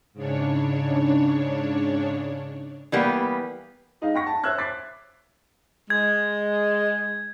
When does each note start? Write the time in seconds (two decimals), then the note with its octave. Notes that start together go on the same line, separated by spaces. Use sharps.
0.13 G#2 C#3 D4 C#5
2.92 E3 G3 A#3 B3
4.01 G#3 D#4 D#5 F5
4.14 F#5 G5 C#6 A#6
4.26 A5
4.44 C5 C#5 E5 E6 F#6 G#6
4.58 D6 A6 B6 C7
5.90 G#3 G#6